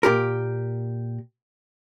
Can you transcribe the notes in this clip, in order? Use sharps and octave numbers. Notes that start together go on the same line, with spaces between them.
A#2 G4 A#4